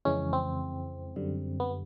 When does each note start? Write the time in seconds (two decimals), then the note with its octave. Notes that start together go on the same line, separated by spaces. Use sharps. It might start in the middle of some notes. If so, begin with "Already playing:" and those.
0.05 F2 C#3 E3 G#3 C#4
0.33 C4
1.16 F#2 D3 G3
1.60 B3